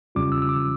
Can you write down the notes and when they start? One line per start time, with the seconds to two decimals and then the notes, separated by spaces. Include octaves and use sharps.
0.15 E2 C#3 G3 C#4 F4 D6
0.32 E6
0.42 E6
0.49 D6